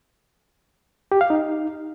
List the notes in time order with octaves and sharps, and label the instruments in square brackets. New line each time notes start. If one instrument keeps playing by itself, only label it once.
[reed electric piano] G4
F5
D#4